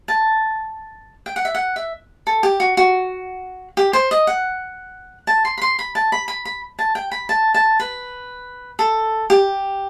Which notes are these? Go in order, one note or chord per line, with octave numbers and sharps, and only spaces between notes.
A5
G5
F#5
E5
F#5
E5
A4
G4
F#4
F#4
G4
C5
D#5
F#5
A5
C6
B5
C6
B5
A5
B5
B5
B5
A5
G5
B5
A5
A5
B4
A4
G4